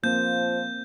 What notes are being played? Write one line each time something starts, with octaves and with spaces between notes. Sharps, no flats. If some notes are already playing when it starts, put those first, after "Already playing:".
F3 A#3 C4 G6